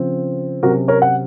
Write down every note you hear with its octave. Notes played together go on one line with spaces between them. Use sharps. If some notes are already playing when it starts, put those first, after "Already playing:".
Already playing: C#3 F3 C4
C3 F#3 C#4 F#4 A#4
A#4 C#5
F#5